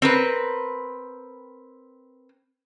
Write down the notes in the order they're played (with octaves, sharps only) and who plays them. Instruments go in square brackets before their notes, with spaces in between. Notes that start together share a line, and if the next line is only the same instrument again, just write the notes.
[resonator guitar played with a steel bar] C4 A#4 B4